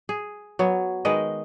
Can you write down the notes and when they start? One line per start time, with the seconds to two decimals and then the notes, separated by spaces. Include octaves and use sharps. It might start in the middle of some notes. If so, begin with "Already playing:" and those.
0.09 G#4
0.59 F#3 B3 C#5
1.05 D#3 G#3 B4 D#5